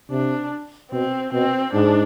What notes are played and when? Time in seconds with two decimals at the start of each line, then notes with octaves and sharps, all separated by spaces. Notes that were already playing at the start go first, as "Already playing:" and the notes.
0.10 C3 D4
0.92 B2 C4
1.33 B2 C4
1.73 G#2 D4